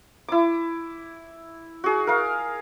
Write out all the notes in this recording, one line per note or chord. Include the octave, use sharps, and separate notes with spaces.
E4 D6
F#4 G#4
A#4 F5